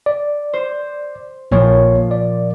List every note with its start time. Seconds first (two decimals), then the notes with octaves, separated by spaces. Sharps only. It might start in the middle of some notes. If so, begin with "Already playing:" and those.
0.06 D5
0.53 C5
1.51 A#1 A#2 F3 A#3 C#5
2.11 D5